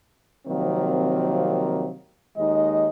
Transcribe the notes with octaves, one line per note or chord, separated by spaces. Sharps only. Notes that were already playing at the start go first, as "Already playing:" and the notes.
C3 D#3 F3 F#3 A#3 C4
D#2 G#3 D#4 D#5